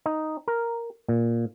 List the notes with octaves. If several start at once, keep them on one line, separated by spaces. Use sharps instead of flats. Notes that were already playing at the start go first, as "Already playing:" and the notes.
D#4
A#4
A#2